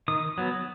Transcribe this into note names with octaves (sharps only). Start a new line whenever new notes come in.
D#3 D#6
F#3 B3